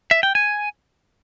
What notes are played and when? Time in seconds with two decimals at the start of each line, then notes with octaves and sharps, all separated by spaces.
0.11 E5
0.23 G5
0.35 G#5